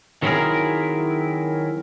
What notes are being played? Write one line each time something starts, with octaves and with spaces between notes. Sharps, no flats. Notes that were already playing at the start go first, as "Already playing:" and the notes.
D#3 F#3 C4 E4 G#4 A#4